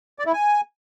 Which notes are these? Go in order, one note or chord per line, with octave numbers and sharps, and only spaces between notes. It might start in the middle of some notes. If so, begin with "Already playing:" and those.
D5
E4
G#5